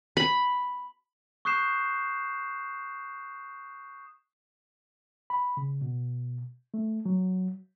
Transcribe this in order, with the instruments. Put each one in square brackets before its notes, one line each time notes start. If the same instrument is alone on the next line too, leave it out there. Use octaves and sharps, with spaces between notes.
[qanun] B5
[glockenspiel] C#6 D#6 F#6 G6 C7 E7
[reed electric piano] B5
C#3
B2
A3
F#3